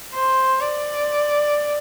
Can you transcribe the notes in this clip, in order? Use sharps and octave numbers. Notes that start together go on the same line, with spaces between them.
C5
D5